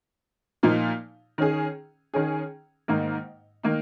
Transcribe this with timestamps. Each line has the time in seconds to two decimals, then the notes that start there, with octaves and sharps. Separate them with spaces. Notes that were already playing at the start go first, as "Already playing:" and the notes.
0.63 A#2 F3 A#3 D#4
1.38 D#3 C#4 G#4
2.14 D#3 C#4 G#4
2.88 G#2 D#3 A#3 D#4
3.63 D#3 A#3 D#4